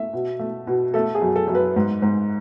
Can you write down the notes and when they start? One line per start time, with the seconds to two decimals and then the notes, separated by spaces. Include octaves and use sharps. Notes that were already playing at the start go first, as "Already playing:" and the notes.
Already playing: A3 E5
0.13 B2
0.39 A3
0.67 B2
0.94 A3 A4
1.15 G#4
1.22 F#2
1.36 A4
1.48 F#2
1.55 B4
1.76 G#2
2.02 G#2